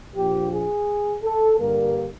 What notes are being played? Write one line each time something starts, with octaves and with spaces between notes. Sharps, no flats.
A#1 A#2 F3 G4
G#4
A4
G2 D3 G3 A#3 A#4